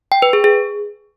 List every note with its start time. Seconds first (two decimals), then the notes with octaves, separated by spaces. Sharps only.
0.12 G5
0.22 B4
0.33 G#4
0.44 G#4